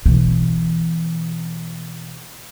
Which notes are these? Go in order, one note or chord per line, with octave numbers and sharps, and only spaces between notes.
B2 E3